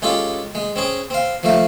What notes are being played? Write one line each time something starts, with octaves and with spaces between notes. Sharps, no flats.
G#3 C#4 F4 G4 A4
G#3
C4 C#4 G#4
C4 F5
F3 A3 F5